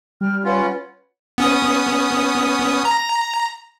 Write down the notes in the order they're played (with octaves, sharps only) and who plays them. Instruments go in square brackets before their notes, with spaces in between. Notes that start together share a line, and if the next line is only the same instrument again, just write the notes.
[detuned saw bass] G3 [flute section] G5 F6
[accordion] C#4 F4 [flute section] B4 C#5 F#5
[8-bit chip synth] B3 C#4 D#6
A#5